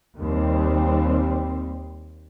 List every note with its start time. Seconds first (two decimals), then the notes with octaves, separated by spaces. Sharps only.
0.16 D#2 G3 C4